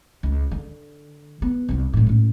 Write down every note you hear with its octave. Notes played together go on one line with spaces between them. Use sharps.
C#2
D3
B3
C2 G3
G#1 A2
A2 C#4